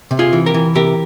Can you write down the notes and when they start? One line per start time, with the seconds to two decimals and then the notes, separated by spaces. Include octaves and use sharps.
0.11 C3
0.19 F4 G#4
0.33 E3
0.46 G4 A#4
0.54 E3
0.75 C3 G4 A#4